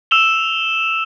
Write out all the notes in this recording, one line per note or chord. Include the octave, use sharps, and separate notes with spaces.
E6 E7 F7 G7